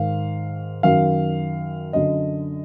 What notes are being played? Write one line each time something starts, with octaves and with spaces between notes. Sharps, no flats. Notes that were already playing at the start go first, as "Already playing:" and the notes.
Already playing: G#2 D#3 F5
F#2 D#3 F5
F#2 D3 D#5